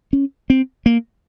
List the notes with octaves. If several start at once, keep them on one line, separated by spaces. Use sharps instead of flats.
C#4
C4
A#3